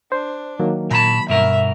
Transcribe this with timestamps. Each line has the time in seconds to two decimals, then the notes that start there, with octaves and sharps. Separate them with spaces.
0.12 D4 C5
0.59 D#3 F#3 A#3
0.91 A#2 A5 B5
1.29 G2 B2 A#4 E5